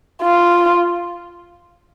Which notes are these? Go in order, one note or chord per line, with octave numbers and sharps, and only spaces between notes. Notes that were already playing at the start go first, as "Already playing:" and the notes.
F4